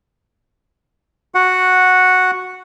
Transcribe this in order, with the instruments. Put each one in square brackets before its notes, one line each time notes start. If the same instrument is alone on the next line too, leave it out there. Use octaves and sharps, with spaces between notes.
[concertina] F#4 F#5